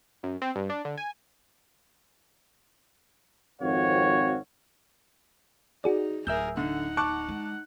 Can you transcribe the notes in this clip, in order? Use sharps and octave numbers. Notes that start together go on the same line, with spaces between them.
F#2
C4
G2
D4
D3
G#5
G#1 F2 C4 F#4 C#5 F5
D#4 F#4 G#4 D5
D1 G#4 A#4 E5 E6 G6
D3 D#4 F#5
A5 C#6 D6 F#6
G#3